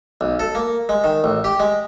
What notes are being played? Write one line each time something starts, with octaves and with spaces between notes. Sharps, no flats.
B1
A4
A#3
G#3
D#3
A1
G4
G#3